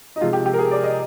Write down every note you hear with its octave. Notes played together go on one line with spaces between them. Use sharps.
D#4
C3 F3 G#3 F4
G4
G4
A#4
G#4
D5
D#5